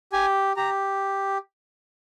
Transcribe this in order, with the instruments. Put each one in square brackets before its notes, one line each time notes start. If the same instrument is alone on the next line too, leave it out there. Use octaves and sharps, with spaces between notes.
[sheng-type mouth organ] G4 G#5
G4 A#5